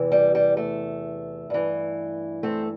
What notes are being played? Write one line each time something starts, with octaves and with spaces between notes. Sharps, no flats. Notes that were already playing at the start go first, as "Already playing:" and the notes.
Already playing: E2 C3 E3
G3
G3
A3
G2 E3
A3 C4